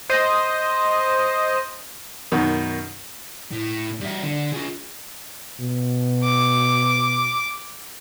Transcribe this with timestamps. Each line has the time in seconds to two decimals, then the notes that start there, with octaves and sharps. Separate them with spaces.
0.10 C5 D#5
2.32 F#2 B2 D#3
3.51 A2
4.00 G2 E5
4.23 D3
4.53 F4 G#4
5.60 B2
6.23 D6